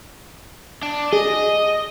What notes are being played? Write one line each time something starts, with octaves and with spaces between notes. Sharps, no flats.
D4
G#4 D#5